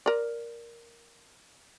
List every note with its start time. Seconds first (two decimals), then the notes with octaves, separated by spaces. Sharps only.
0.06 A#4 D5